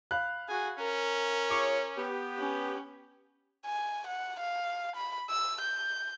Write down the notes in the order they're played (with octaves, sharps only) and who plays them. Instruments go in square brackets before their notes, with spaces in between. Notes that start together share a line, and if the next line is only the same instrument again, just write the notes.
[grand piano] F5 B5 F#6
[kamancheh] F#4 G#4 [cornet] G#5
[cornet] C#4 [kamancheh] A#4
[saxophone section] F4 G#4 C#5 [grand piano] D6
[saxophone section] B3 G4
[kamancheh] C#4
[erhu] G#5
F#5
F5
B5
E6
G6